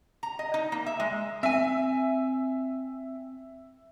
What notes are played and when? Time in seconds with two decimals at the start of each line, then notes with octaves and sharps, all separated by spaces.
0.23 A#5
0.39 D#5
0.54 D#4
0.72 A#3
0.86 E5
1.00 G#3
1.43 C4 E5 G#5